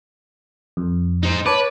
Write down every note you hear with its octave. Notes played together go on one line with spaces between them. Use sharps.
F2
D#4 C5
B4 C#5 A5 D6